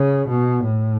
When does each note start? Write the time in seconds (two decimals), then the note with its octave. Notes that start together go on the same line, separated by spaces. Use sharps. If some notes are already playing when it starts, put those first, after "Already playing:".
Already playing: C#3
0.28 B2
0.65 A2